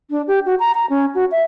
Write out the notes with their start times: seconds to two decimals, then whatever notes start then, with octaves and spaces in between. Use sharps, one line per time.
0.11 D4
0.28 G4
0.46 F#4
0.59 A#5
0.75 A#5
0.90 C#4
1.15 F#4
1.31 E5